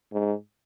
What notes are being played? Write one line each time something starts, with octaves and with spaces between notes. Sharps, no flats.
G#2